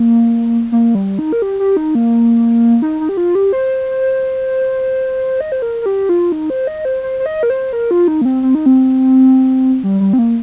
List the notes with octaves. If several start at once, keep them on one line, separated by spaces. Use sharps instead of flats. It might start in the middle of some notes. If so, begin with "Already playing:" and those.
Already playing: A#3
A#3
G3
D#4
A#4
G4
G4
D#4
A#3
D#4
D#4
G4
F4
G4
C5
D#5
C5
A#4
A#4
G4
F4
D#4
C5
D#5
C5
C5
C5
D#5
A#4
C5
A#4
F4
D#4
A#3
C4
C4
D#4
C4
G3
G3
C4
A#3